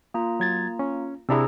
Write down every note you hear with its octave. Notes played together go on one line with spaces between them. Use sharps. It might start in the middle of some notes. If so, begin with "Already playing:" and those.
A#3 F4 A#5
F#3 G#6 A6
C#4
C3 D4 E4 G#4 A#5 E6